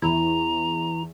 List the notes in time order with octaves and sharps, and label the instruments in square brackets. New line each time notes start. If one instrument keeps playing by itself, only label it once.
[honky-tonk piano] E2 [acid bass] E4 [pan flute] A#5